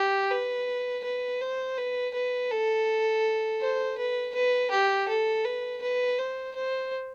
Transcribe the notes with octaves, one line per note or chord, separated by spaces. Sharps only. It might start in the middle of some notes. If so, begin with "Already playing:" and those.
Already playing: G4
B4
B4
C5
B4
B4
A4
C5
B4
B4
G4
A4
B4
B4
C5
C5